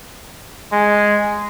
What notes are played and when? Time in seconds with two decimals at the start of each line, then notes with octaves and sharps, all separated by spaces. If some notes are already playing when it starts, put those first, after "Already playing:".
0.72 G#3